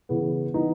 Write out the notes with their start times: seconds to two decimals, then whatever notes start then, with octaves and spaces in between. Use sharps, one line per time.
0.09 C#3 E3 B3
0.54 E3 B3 D#4